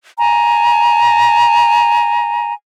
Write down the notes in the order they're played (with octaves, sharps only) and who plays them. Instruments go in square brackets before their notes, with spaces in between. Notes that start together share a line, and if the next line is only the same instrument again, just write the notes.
[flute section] G#5 A#5